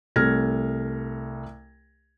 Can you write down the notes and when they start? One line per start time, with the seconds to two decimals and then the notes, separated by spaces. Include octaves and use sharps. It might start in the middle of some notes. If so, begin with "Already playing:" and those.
0.16 C2 A3 F6 G#6 A#6